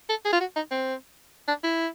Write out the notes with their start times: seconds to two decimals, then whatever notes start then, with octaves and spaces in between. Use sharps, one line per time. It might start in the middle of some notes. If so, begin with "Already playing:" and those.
0.10 A4
0.25 G#4
0.33 F4
0.40 F#4
0.56 D#4
0.71 C4
1.48 D4
1.64 E4